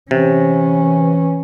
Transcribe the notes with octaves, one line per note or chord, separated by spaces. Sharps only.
C3 E3 C#4